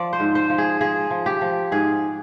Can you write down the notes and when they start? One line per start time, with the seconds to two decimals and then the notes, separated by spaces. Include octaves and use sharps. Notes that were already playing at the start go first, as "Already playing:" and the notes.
Already playing: F3 D5
0.13 C5
0.20 G#2
0.35 C5
0.50 F3
0.58 G#4
0.81 F3 G#4
1.11 F3
1.26 G4
1.41 F3
1.72 G#2 G#4